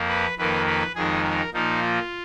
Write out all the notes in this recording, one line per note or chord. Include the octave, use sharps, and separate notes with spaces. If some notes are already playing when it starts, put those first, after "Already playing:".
Already playing: F2 F3 A#3
B4
F2 D#3 A#3 B4
B4
F2 D#3 G#3 G#4
A#4
A#2 F3 A#3 D#4
F4